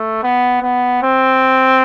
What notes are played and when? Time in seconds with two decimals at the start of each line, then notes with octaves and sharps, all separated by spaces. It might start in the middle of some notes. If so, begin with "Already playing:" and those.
Already playing: A3
0.23 B3
0.62 B3
1.02 C4